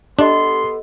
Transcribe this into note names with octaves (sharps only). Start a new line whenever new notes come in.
B3 D4 G4 A4 D#5 C6